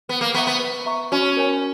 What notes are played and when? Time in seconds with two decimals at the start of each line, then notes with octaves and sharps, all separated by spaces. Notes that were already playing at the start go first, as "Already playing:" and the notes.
0.09 B3 B4
0.21 A#3
0.34 B3 E5 A#5 C#6
0.47 B3
0.59 B4
0.86 E5 A#5 C#6
1.12 C#4 F#4
1.37 A#4 C#5 G#5